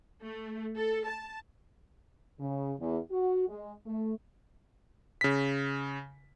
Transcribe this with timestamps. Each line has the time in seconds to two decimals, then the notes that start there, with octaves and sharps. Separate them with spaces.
0.23 A3
0.77 A4
1.07 A5
2.39 C#3
2.79 E2
3.11 F#4
3.48 G#3
3.86 A3
5.21 C#3 B6